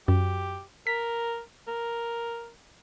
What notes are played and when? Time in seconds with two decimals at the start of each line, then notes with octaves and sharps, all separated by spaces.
0.08 F#2 G4
0.87 A#4 B6
1.68 A#4